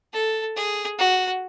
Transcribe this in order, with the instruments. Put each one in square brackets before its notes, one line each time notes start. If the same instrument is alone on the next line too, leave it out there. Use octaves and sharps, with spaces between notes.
[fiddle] A4
G#4
F#4